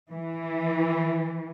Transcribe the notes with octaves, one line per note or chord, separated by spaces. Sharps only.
E3